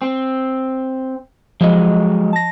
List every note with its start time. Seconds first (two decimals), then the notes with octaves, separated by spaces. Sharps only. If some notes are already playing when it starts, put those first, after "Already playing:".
0.02 C4
1.61 F3 F#3 G#3 D#5
2.33 A5 A#6